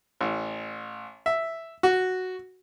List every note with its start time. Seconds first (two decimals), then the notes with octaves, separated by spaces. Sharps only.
0.21 A1
1.26 E5
1.83 F#4